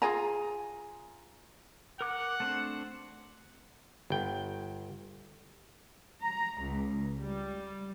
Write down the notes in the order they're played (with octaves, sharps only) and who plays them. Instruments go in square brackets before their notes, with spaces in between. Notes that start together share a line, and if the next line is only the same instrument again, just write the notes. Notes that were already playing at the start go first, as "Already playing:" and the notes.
[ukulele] F4 G#4 G#5 A#5
[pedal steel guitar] A#4 D6 F#6 [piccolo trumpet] F#5
[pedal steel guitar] A3 C4 D4
[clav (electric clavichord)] G1 G5
[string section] A#5
C#2
G3